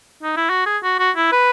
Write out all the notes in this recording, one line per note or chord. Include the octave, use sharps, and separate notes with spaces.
D#4
E4
F#4
G#4
F#4
F#4
E4
B4